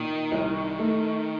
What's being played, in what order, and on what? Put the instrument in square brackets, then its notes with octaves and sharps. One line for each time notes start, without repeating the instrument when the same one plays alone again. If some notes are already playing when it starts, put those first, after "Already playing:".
Already playing: [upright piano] A#2 [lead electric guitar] D#3
[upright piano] C2
A3